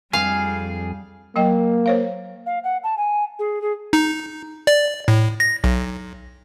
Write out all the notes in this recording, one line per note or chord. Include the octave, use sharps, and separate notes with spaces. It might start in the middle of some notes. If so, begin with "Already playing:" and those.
F2 G3 G#4 F5 G#5
F#3 A#3 D#5 G5
C5 C#5 F5
F5
F#5
A5
G#5
G#4
G#4
D#4
D5
A2
A#6
B1